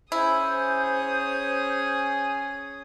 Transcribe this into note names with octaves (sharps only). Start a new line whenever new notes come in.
C#4 E4 G#4 C5 D#6